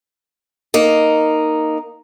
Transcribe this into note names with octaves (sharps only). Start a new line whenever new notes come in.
A#3 D#4